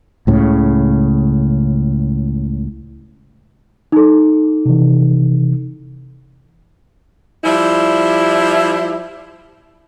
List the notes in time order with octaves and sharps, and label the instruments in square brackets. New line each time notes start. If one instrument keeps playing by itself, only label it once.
[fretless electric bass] C#2 A2 C#3
[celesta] D#4 A4
[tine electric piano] C3 E3
[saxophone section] F3 G3 E4